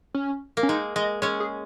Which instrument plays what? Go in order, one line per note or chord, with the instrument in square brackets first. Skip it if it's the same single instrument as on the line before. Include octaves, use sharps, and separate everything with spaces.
[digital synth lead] C#4
[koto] A#3
[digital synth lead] C#4
[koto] G#3 [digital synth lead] D#4
[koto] G#3 [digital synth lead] D#5
[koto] G#3 C#4 [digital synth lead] C#5
[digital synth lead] G#4